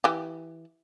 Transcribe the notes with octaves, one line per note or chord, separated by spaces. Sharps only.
E3 G4